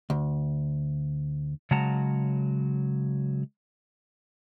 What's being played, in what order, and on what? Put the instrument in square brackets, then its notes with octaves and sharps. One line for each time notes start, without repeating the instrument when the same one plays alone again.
[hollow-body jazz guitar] D2
[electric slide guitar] C#3 F#3 G#3 F#5 A5 A#5